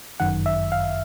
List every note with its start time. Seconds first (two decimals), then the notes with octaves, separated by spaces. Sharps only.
0.20 G1 F#2 D#3 F#5
0.46 E5
0.72 F5